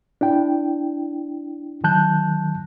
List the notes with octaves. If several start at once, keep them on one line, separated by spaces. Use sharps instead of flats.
D4 E4 G5
D#3 F#3 A5 F#6 G6